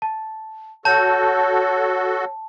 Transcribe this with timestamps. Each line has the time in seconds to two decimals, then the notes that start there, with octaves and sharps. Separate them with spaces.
0.02 A5
0.85 F#4 A4 C#5 A5 G6